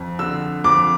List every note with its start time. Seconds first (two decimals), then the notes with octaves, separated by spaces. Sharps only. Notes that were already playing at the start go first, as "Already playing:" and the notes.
Already playing: F2
0.19 D3 E6
0.64 F2 D6